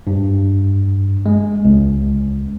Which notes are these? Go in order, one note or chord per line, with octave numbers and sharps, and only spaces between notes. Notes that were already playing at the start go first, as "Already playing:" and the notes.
G2
G#3
C#2